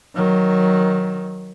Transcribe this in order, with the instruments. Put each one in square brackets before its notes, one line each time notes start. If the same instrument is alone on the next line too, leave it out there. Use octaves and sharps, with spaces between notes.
[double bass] D#3 F#3